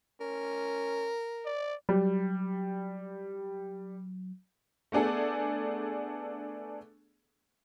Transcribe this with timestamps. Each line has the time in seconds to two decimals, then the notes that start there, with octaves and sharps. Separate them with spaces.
0.21 C#4 A#4
1.45 D5
1.89 F#3 G3
4.92 A3 B3 D4 G#4 A4